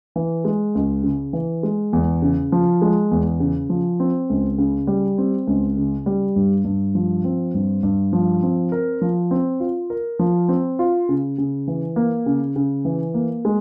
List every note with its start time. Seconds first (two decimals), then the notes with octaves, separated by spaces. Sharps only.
0.16 E3
0.45 G#3
0.75 C#2
1.04 C#3
1.33 E3
1.63 G#3
1.93 E2
2.22 C#3
2.52 F3
2.82 G#3
3.11 E2
3.40 C#3
3.70 F3
4.00 C4
4.30 C#2
4.58 C#3
4.87 G3
5.18 C4
5.47 C#2
5.77 C#3
6.06 G3
6.36 G2
6.65 G2
6.95 F3
7.24 C4
7.54 G2
7.83 G2
8.13 F3
8.43 C4
8.72 A#4
9.01 F3
9.31 C4
9.60 F4
9.90 A#4
10.19 F3
10.49 C4
10.79 F4
11.09 C#3
11.38 C#3
11.67 E3
11.96 A#3
12.26 C#3
12.56 C#3
12.85 E3
13.14 A#3
13.45 G#3